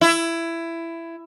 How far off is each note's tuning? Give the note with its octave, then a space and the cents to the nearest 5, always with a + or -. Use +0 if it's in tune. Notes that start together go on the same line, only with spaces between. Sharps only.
E4 +15